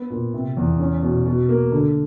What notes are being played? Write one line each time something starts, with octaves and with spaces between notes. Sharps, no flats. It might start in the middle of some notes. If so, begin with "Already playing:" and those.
Already playing: B3
A#2
C3
E2
C#4
B2
B2
A#3
D3